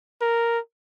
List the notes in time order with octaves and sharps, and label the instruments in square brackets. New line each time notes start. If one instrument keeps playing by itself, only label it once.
[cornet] A#4